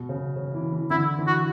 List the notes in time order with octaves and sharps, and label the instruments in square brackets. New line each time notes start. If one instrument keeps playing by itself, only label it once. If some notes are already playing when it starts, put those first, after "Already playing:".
Already playing: [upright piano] B2
C#3
C#3
E3
E3
[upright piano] D3 [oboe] E4
[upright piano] E3
[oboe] F#4